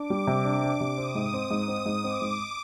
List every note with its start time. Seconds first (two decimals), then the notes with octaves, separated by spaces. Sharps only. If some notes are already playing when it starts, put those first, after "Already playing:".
Already playing: D4 D6
0.10 G3
0.27 C3
0.45 D4
0.63 D4
0.80 C3
0.98 C4 D#6
1.15 G#2
1.34 C4
1.51 G#2
1.68 C4
1.86 G#2
2.03 C4 D6
2.21 G#2